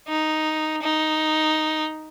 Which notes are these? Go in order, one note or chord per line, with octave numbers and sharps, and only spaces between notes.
D#4
D#4